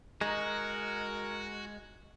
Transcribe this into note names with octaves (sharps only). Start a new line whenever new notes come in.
G#3 D#4 F#4 A#4